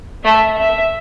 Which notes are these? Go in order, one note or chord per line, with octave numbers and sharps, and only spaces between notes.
A3 E5
E5